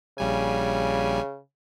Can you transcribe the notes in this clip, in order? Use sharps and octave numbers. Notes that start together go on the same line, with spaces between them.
A#1 C#3 G3 G#5